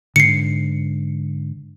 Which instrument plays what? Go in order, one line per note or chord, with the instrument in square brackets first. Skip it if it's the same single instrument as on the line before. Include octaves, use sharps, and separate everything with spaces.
[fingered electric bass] G#2 D3 [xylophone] C7 C#7